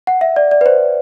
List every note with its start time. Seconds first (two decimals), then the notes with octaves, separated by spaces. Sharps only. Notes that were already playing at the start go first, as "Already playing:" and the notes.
0.07 F#5
0.21 E5
0.36 D5
0.51 D5
0.61 B4
0.66 C5